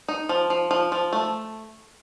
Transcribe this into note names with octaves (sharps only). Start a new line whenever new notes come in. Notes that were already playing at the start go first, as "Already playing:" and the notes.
D#4
F3
F3
F3
F3
A3